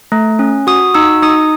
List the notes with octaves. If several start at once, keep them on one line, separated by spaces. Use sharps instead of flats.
A3
C#4
F#4 D#6
D#4 E6
D#4 D#6